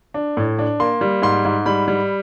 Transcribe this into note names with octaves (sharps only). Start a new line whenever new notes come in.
D4
A2
D4
A#3 C6
G3
G#2 C6
G#2
G3 B5
G3